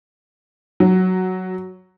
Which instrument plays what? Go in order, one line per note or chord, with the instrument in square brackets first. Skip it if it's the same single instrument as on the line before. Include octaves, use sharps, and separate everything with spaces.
[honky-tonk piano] F#3